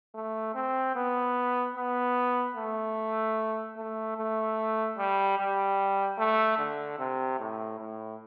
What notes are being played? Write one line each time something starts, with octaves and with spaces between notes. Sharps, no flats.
A3
C4
B3
B3
A3
A3
A3
G3
G3
A3
D3
C3
A2
A2